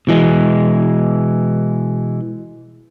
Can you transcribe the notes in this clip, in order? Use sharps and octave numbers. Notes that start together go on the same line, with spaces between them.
B2 E3 G#3